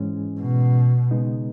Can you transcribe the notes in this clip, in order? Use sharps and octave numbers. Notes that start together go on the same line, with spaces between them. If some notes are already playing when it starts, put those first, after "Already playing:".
Already playing: G#2 E3 G#3 C#4
B2
C#3 G#3 B3 D#4